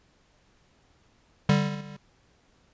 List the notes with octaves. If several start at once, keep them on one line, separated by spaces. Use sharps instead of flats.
D3 G3